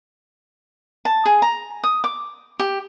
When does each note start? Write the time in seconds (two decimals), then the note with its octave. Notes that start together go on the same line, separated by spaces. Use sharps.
1.05 A5
1.26 G#4
1.42 A#5
1.83 D#6
2.04 D6
2.60 G4